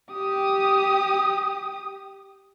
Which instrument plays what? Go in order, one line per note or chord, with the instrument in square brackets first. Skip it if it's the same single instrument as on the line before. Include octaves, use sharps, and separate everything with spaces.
[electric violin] G4 D#6